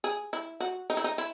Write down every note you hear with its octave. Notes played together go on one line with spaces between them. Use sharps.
G#4
E4
F#4
D#4
E4
D#4
E4